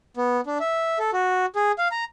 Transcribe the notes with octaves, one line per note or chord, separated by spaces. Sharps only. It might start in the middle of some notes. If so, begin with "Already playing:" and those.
B3
D4
E5
A4
F#4
G#4
F5
A#5